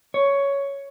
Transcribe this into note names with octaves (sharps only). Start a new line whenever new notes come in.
C#5